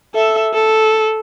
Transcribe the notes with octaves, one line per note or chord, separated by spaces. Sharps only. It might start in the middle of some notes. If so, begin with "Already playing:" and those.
A4 E5
A4